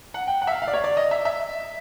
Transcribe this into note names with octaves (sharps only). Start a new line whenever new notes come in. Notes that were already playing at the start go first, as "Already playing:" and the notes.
F#5
G5
F#5
E5
F5
F5
D5
C#5
D5
D#5
E5
E5